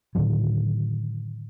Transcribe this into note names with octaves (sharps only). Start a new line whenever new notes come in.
A2 D3 D#3 F#3